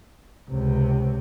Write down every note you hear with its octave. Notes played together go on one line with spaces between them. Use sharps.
C#2 C3